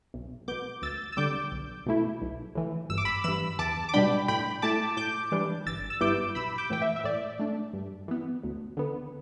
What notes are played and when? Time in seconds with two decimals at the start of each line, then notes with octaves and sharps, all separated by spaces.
0.14 B1
0.48 B2 B3 D6 G6
0.82 D2 E6 A6
1.12 E6
1.17 D3 G3 D6 G6
1.52 B1
1.86 B2 A3 E4
2.21 B1
2.55 A2 E3
2.89 G1 E6
2.98 D6
3.05 B5 E6
3.24 G2 E3 B5 E6
3.59 E2 A5 D6
3.89 D6
3.93 B2 G3 D4 G5 B5
4.28 A2 G5 B5
4.62 A3 E4 A5 D6
4.97 A2 D6 G6
5.32 E3 G3 D4
5.66 G1 E6 A6
5.90 E6
6.00 G2 G3 B3 E4 D6 G6
6.35 B1 B5 E6
6.58 D6 G6
6.70 A2 E3 G5
6.82 E5
6.96 E5
7.04 A2 D5
7.39 A3 D4
7.73 G2
8.08 E3 B3
8.43 D2
8.77 D3 B3